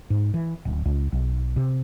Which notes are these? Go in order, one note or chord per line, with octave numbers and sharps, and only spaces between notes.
G#2
E3
D1
C#2
B1
C3